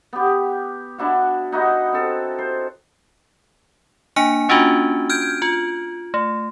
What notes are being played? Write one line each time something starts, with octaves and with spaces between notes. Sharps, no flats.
B3 G4
D4 E4 F#4
D#4 E4 F#4 D#5
C4 A4
C5
A#3 D4 G#5 C#7
A#3 C#4 D4 F4 F#4
F6 G6 G#6 D7
F4
A3